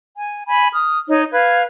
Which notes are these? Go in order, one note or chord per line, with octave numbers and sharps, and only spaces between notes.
G#5
G#5 B5
D#6 F6
D#4 C#5
B4 F5 G#6